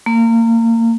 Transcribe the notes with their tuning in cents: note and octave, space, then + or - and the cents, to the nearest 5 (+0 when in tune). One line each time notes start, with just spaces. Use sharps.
A#3 -30